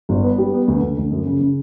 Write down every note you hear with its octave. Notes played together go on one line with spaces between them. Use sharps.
G1
B3
G3
B3
D2
D2
D2
F#2
C#3
C#3